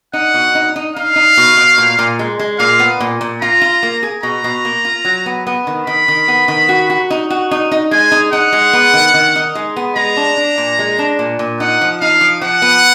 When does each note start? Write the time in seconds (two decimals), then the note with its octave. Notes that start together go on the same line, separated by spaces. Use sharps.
0.13 D#4 F#5
0.34 B2
0.55 D#4
0.76 D#4
0.96 D#4 F5
1.16 D#4
1.37 B2
1.57 B2
1.78 A#2
1.99 A#2
2.19 G#3
2.39 G#3
2.59 A#2 F5
2.79 B3
3.00 A#2
3.21 A#2
3.41 F4 A#5
3.61 F4
3.83 A#3
4.03 G#4
4.23 B2 A#5
4.44 B2
4.65 A#3
4.85 F4
5.05 F#3
5.26 B3
5.47 B3
5.67 D#3
5.87 D#3 B5
6.08 D#3
6.28 B3
6.48 D#3
6.69 F#4
6.90 F#4
7.10 D#4
7.30 F#4
7.51 D#4
7.71 D#4
7.91 G#3 G#5
8.12 D#4
8.33 D#4 F#5
8.53 G#3
8.73 B3
8.93 D#3
9.14 D#3
9.36 D#4
9.55 G#3
9.76 B3
9.96 G#3 A#5
10.17 D4
10.37 D4
10.58 A#2
10.79 G#3
10.99 D4
11.19 A#2
11.39 A#2
11.60 D#4 F#5
11.81 F3
12.00 D#4 F5
12.21 F3
12.41 F3 F#5
12.62 B3